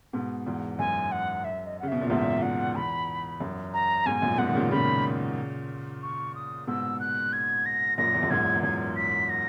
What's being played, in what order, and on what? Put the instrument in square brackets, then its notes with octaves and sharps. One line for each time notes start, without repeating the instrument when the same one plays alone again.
[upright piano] G#2 B2
E2 G#2
[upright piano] F#2 [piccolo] G#5
[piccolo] F#5
E5
D#5
[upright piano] C#3 [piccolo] F#5
[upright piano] B2 [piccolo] E5
[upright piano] A#2
[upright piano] E2 G#2 [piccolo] E5
[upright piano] E2 [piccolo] F#5
[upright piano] E2 [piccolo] B5
[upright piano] F#2
[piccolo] A#5
[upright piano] G#2 B2 [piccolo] G#5
[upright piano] F#2 A#2
[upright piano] G#2 B2 [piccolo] F#5
[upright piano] D#3
A#2 C#3
[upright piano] A#2 C#3 [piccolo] B5
[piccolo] C#6
D#6
[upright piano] G#2 B2 [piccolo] E6
[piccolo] F#6
G#6
A#6
[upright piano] F#2 A#2 [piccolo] A#6
[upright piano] E2
F#2
[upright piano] E2 G#2 [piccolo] G#6
[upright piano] E2
[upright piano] F#2 [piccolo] G#6
[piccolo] B6
A#6